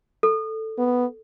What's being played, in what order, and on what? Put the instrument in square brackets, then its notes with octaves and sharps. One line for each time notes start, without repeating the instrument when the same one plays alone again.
[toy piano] A4
[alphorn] B3